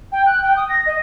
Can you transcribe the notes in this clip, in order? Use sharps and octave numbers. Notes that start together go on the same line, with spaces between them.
G5
F#6
G5
D#6
A#6
D#5